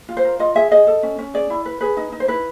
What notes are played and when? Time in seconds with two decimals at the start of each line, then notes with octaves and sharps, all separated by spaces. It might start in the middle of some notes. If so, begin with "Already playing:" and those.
0.09 F4
0.17 C5
0.25 A#4
0.40 F4 D#5
0.55 G#4 E5
0.71 G#4 D#5
0.87 A4
1.03 C#4
1.19 C#4
1.34 G#4 D5
1.50 E4
1.65 B4
1.81 G#4 B4
1.97 D#4
2.12 D#4
2.20 C5
2.28 E4 B4